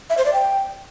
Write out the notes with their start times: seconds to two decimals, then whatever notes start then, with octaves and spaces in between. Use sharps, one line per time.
0.10 E5
0.18 C5
0.25 D5
0.33 G5